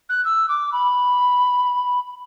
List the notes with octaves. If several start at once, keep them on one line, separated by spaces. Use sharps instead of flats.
F#6
E6
D6
B5